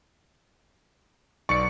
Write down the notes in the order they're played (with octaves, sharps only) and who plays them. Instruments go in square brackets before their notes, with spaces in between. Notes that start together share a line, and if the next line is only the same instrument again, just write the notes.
[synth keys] B1 D5 [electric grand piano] C#6 C#7